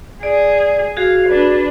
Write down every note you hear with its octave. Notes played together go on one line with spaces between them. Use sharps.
G#4 D5
F#4 G#4 F5
D4 B4